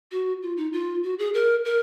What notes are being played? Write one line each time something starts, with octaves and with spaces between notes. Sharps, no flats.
F#4
F4
D#4
F4
F#4
G#4
A#4
A#4